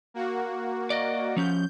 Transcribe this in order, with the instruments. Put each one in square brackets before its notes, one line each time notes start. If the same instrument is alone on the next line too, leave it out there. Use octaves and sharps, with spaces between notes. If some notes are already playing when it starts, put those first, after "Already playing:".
[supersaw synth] A#3 F#4
[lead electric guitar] D5 D#5
[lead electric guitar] F3 C#4 [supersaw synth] G6